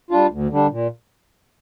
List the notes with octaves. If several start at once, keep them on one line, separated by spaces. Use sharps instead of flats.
G3 D4 F4
D2
D3 G3 D4
A#2